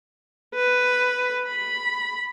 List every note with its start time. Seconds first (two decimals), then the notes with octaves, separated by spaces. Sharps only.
0.55 B4
1.46 B5